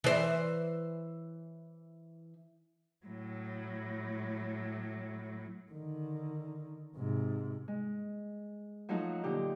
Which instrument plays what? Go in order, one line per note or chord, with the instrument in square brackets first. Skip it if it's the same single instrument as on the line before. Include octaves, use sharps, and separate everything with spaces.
[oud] E3 C5
[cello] A2 F#3
[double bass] D3 D#3
G#2 C3
[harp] G#3
F3 F#3 A3 D#4 F#4
A#2 D3 D#4 G4